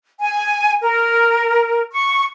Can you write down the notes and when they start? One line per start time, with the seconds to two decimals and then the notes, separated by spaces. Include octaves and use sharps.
0.21 G#5
0.82 A#4
1.93 C#6